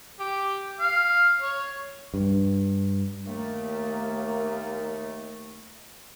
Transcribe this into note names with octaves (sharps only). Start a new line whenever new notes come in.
G4
F5
C#5
G2
D#2 A3 A#3